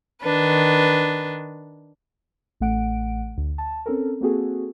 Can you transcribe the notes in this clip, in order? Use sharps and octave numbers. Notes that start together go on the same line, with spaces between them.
D#3 D4 B4
A1 A3 F#5 D7
D2
A5
C4 C#4 A4 A#4
A#3 C4 F#4 G#4 A4